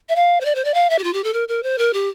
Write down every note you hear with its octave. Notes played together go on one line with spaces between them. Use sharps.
E5
F5
C5
D5
C5
D5
F5
E5
G4
F4
G4
A4
A#4
A#4
C5
A#4
G4